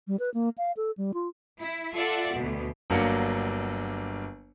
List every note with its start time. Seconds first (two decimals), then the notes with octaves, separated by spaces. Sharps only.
0.08 G3
0.20 B4
0.34 A#3
0.58 F5
0.77 A4
0.98 G3
1.14 F4
1.61 E4
1.95 F4 A4 D5 E5 F#5
2.34 D2 B2
2.90 G1 F#3 A#3 D4 C#7